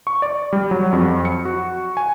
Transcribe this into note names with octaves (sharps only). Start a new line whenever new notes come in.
C#6
D5
G3
F#3
F2
C#7
F#4
G#5